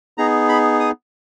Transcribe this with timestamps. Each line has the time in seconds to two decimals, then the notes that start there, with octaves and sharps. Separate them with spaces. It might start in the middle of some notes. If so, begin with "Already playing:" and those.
0.18 B3 D#4 G#4 A#5
0.49 B5
0.80 D#6